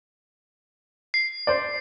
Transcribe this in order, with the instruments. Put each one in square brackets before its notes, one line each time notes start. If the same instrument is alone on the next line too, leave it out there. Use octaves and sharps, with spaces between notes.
[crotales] C7
[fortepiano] C5 D5